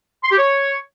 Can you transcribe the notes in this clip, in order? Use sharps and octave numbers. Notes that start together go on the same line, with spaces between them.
C6
G4
C#5